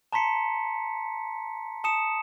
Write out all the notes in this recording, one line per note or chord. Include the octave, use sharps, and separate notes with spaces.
A5 A#5 C6 B6 C#7
A5 D#6 C#7 E7